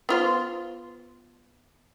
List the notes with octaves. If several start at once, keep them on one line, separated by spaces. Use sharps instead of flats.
B3 F4 C5